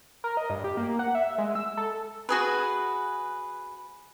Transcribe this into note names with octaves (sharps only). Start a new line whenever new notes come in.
A#4
D#5
G2
G4
A#3
F#5
E5
G#3
E6
A4
F#4 G#4 B4